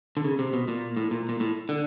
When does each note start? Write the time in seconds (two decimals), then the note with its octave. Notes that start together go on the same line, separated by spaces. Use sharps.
0.17 D3
0.24 C#3
0.39 C3
0.53 B2
0.68 A#2
0.97 A2
1.11 A#2
1.29 A#2
1.40 A2
1.69 D3